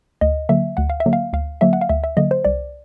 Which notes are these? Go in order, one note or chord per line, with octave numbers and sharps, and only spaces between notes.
D2 D#5
D3 F#3 A#3 E5
D2 F#5
F5
E5
D3 F#3 A#3
F5
D2 F5
D3 F#3 A#3 E5
F#5
F5
D2 E5
E5
D3 F#3 A#3 D#5
C5
C2 D5